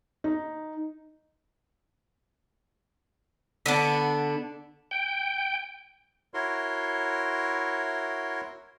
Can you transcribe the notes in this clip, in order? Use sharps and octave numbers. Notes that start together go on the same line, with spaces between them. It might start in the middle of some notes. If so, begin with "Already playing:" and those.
D#4
D3 B3 D4
G5
E4 F#4 A#4 C#5 C6